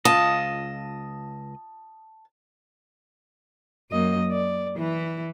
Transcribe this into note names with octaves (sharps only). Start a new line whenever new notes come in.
C#2 F4 D#5 A5 D#6
F#2 A#3 D#5
D5
E3 E4